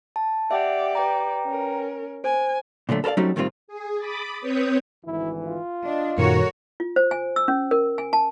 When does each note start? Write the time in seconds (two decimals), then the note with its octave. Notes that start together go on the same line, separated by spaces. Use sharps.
0.16 A5
0.51 G4 D5 E5 F#5 G5
0.95 B4 G5 A#5
1.46 C#4 A#4
2.24 C5 G#5
2.89 A#2 D3 F#3 A3
3.04 A4 A#4 C5 D5 F5
3.17 F#3 G3 A3 C4 C#4 D#4
3.36 A2 D#3 G3 C4 F4
3.68 G#4
3.98 B5 D6 D#6 A6
4.41 C4 B4 C#5 D#6 G6
5.05 G#1 D2 E3 E4
5.45 F4
5.84 D4 D#5
6.18 F#2 A#2 D#3 G3 F#4 A4 A#4 C#5
6.80 F4
6.96 C5
7.11 G#5
7.36 E6
7.48 C#4
7.71 A#4
7.98 G#5
8.13 A5